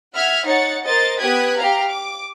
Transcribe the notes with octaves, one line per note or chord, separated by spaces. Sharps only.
E5 F#5 F6 G#6 B6
D#4 C#5 F#5 A6 C#7
A#4 C5 D#5 A6
B3 G4 D#6 F#6 G#6 B6
G4 F5 A#5
D6